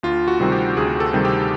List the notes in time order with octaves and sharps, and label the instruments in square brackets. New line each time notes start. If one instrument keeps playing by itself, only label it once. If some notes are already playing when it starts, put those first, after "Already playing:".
[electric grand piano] D2 F4
F#4
C3 D#3 G3 C4
G4
D2 G#4
A4
C3 D#3 G3 C4
G4